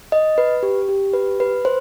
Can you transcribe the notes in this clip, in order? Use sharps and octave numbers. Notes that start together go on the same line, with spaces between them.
D#5
B4
G4
G4
B4
B4
C5